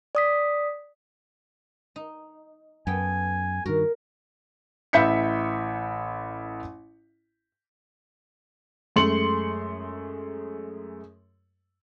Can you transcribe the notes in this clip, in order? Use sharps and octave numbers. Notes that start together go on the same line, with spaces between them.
D5 D#6 B6
D#4
F#2 B3 A4 G5 G#5
G2 D#3 F#4 A#4
A1 E5 B5 G6 B6 C#7
F#2 G#3 A3 C6 C#7 F#7